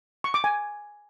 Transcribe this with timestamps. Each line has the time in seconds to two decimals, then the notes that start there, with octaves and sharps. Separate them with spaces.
0.24 C#6
0.34 D6
0.44 G#5